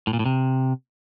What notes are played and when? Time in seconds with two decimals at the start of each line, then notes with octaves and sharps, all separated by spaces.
0.07 A2
0.13 A#2
0.19 A2
0.26 C3